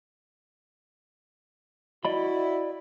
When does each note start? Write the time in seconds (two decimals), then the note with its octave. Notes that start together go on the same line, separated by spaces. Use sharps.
2.05 E4 F#4 D5 D#5 B5